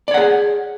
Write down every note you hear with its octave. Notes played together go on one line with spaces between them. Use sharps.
G#4 C#5 D5 F#5